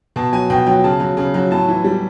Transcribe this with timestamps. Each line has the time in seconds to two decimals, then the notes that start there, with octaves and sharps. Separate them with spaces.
0.16 B2 A5
0.33 F#3 G#5
0.50 B2 G5
0.66 F#3 G5
0.84 C#3 A5
1.00 F#3
1.17 C#3
1.34 F#3
1.51 A2 A5
1.68 E3
1.84 G3